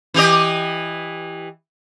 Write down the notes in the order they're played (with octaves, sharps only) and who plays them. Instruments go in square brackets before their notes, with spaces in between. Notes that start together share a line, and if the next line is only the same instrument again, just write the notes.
[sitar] E3 G4 D#5